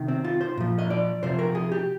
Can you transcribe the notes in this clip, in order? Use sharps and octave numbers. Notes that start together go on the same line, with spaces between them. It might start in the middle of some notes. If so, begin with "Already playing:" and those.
Already playing: C3 D#3
C4
F4
C5
A#2 F3
D#5
D5
C3 F3 C5
A#4
G#4
G4